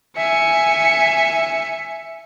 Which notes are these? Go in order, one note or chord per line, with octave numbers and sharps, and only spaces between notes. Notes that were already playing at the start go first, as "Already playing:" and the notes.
E5 G#5 C#7